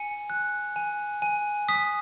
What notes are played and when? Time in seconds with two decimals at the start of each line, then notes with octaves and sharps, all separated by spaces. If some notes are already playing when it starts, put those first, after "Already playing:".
Already playing: G#5 C#7
0.30 F#6
0.76 G#5
1.22 G#5
1.68 D#6 B6